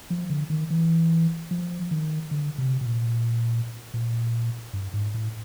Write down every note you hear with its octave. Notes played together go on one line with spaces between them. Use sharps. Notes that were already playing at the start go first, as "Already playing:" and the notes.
F3
D3
D#3
E3
F3
D#3
D3
C3
B2
A#2
A#2
G2
G#2
A2